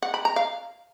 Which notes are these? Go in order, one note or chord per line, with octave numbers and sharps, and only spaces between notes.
F#5
B5
A#5
F5